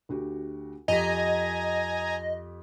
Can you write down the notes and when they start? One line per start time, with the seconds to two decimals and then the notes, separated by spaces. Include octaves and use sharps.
0.09 D2 F#4 G4
0.88 F2 G4 D#5 G#5 A#5 D#6 B6